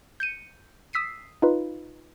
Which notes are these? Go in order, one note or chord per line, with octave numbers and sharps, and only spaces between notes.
G6 C#7 D#7
D#6 E6 B6 C7 D#7
D#4 F4 B4